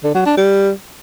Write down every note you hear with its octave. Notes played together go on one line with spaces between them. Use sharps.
D3
F#3
D4
G3